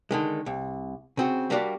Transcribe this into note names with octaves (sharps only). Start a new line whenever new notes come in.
D3 D#3 G#3
C2
C#3 C4 F#4
G3 A#3 D4 F#4 G4 D5